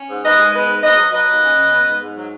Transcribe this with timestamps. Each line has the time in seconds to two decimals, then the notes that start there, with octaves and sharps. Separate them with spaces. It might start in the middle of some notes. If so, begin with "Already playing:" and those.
Already playing: C#4
0.09 G#2
0.23 G#2 B4 D#5
0.38 G#3
0.53 B3 B4 D#5
0.68 G#2
0.82 G#2 B4 D#5
0.97 F#3
1.12 F#3 B4 D#5
1.27 D#2
1.42 C#4
1.57 C#3
1.71 B3
1.87 G#2
2.00 G#2
2.16 F#3